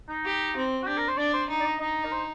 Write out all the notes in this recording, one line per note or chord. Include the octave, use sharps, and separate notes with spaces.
D#4
G4
C4
F#4
D4 G4
A#4
C5
D4 D5
C5
D#4
D5
D#5
D#4 D#5
A#4
C5